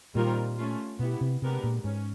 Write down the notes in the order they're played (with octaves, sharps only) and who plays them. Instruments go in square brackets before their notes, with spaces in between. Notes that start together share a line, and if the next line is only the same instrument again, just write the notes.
[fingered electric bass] A#2 [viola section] D#3 G3 C4 F4 A#4
[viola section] A3 C#4 F4
[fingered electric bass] B2 [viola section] B3 E4 G4
[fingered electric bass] C3
[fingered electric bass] C3 [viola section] G#3 B3 D4 G4 A#4
[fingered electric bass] A#2
[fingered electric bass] G#2 [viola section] C#4